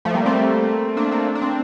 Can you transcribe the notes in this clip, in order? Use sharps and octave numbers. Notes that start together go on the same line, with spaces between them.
F3 A3
G3 A#3
A3 C4
A#3 D4
A#3 D4
D4
C4